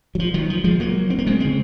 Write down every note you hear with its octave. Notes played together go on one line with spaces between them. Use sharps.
F#3
F3
D#3 F#3
F3
F3 G#3
F#3 A#3
C4
A#3
G#3 C4
C#3 G#3 C4